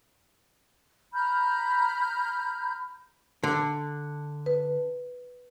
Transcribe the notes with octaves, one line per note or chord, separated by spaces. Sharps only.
A#5 B5 F6 G6
D3
B4